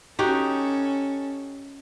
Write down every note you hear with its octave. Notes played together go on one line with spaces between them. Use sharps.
C#4 D#4 F#4 G4 A4